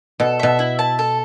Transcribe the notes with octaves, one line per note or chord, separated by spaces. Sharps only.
B2 A4
B2 E5
E4
A5
A4